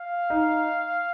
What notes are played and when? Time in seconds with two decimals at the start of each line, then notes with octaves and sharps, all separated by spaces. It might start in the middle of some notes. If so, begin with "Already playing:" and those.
Already playing: F5
0.30 D#4